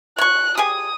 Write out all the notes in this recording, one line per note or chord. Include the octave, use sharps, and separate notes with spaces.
C#5 C#6 F#6
G4 G#4 G#5 D#6